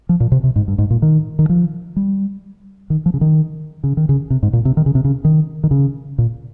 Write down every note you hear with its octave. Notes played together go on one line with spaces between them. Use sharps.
F3
A#2
C3
C3
G#2
G2
G#2
A#2
D#3
D#3
F3
G3
D#3
F3
C#3
D#3
C#3
D#3
C#3
C3
G#2
A#2
C3
D#3
C#3
C3
C#3
D#3
D#3
C#3
A#2